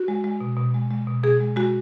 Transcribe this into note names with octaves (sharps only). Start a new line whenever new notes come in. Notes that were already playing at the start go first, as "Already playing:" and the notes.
Already playing: F#4
G#3
G#3
B2
B2
G#3
G#3
B2
B2 G#4
G#3
G#3 F#4